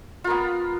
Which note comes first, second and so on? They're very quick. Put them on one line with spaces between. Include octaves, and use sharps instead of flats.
F4 A#4 B3